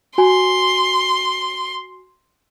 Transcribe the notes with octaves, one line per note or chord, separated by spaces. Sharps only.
F#4 G#5 C6